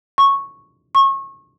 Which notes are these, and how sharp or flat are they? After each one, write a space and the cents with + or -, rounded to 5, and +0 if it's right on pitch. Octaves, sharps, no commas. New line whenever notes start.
C#6 -5
C#6 -30